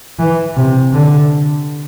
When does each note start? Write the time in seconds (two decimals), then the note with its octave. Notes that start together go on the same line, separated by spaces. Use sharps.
0.19 E3
0.57 C3
0.94 D3